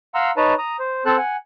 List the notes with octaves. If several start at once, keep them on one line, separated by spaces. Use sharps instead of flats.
F5 F#5 A#5 C6 E6
D#4 B4 C#5 A5 A#5
A#5 D#6
C5
C4 A4 C5 A5 F#6
F#5 G#5